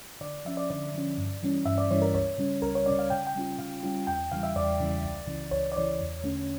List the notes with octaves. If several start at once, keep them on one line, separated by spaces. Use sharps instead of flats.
D3 D5
F3 C#4 E5
D5
D3 D5
F3 C#4
G2
E3 G3 C#4
G2 E5
D5
E3 G3 C#4 C#5
A#4
C#2 C#5
C#3 G3 C#4
C#2 A#4
C#5
C#3 G3 C#4 D5
F5
C#3 G5
G5
G3 C#4 F4
C#3 F5
G3 C#4 F4
E2 G5
C#3 E3 G3 F5
E5
E2 D5
C#3 E3 G3
C#2
C#3 E3
C#2 C#5
D5
C#3 E3 C#5
E2
D3 A3 C#4